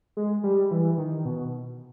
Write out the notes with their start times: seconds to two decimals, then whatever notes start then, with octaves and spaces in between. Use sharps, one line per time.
0.17 G#3
0.44 G3
0.71 E3
0.98 D#3
1.25 B2